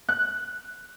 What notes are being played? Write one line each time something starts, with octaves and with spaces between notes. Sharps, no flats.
F#6